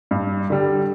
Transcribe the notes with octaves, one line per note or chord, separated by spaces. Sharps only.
G2
D3 G3